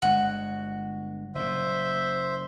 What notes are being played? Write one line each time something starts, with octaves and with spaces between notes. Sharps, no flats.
G1 G#3 F#4
F#1 A#2 C5 E5